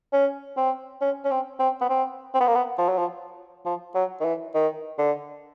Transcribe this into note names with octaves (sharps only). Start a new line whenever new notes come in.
C#4
C4
C#4
C#4
C4
C4
B3
C4
C4
B3
A#3
B3
F3
F#3
F3
F3
F#3
D#3
E3
D#3
D3